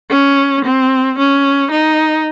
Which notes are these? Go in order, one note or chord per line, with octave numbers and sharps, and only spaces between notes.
C#4
C4
C#4
D#4